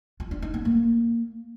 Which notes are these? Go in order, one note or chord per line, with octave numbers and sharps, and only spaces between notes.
F4
D4
D#4
B3
A#3